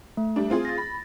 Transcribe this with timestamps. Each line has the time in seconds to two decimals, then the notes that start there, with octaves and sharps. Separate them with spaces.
0.17 A3
0.36 G3 D4
0.50 C4 F4 G#4
0.65 A6 A#6
0.78 B5